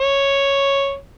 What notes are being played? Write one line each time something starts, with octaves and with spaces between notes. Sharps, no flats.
C#5